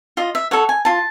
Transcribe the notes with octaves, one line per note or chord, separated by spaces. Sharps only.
F4 D#5
E5
A4 C#5 F#5
G#5
F4 A5